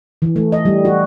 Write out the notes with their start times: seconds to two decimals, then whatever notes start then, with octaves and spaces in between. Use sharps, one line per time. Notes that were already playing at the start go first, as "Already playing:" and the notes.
0.22 E3
0.36 A3
0.52 D#5
0.65 G3
0.85 F#4